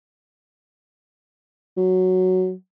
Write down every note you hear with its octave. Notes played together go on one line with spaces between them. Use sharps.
F#3